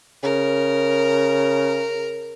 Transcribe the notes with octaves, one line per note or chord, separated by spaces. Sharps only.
C#3 A#4